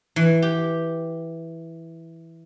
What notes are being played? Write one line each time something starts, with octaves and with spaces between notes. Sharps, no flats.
E3
G4